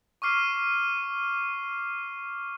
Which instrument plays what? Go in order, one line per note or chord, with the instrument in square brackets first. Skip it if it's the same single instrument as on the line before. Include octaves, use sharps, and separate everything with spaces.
[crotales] C#6 D6 F6 C7 D#7